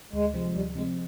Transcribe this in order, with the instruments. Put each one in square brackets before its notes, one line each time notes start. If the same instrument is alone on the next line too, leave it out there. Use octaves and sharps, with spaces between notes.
[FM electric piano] D2 [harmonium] G#3
[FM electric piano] C3 F3 C4
[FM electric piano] D2 [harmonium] G3
[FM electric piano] C3 F3 C4 [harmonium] G#3